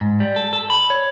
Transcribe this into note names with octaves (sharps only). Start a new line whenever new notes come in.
G#2
G3
A4
A4
B5
C#5